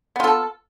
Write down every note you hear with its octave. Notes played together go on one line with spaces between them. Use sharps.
B3 F4 A4